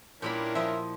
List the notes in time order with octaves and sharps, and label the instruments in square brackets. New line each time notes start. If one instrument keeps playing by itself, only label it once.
[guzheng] A#2 G3 B5 [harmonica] C#4 D4 A#4 [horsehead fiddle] E4
[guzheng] F3 D#5 [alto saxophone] E5